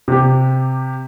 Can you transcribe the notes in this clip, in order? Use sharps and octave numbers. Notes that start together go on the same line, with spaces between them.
C3 G4